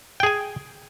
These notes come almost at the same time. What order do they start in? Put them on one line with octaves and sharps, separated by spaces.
G5 G#4 G#5